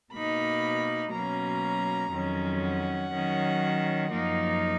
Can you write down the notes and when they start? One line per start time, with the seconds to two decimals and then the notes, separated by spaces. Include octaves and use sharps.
0.13 B2 A#3 D#4 B5
1.12 B2 F#3 A#3 C#4 A#5
2.11 F2 D#3 F#3 C#4
2.61 F#5
3.12 D#3 F#3 C#4
4.10 F#2 F3 A#3 D#4